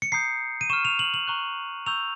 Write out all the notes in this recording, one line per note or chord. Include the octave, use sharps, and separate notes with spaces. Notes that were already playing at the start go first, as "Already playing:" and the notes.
C#7
A#5 D#6 G6 C7
D#7
C#6 F6 E7
F7
F#7
F#7
A#5 C#6 F#6
A#5 C#6 E6 G6 F7